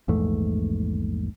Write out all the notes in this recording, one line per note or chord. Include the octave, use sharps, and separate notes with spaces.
A#1 E2 G#2 A3